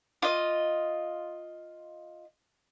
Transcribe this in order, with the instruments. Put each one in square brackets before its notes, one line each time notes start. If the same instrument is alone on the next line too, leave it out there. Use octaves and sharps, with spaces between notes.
[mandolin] F4 D#5